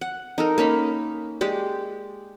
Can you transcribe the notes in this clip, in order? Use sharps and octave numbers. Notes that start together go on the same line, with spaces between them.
F#5
D#4 A4 A#4
A#3 C#4 D#4 B5
G#3 G4 D5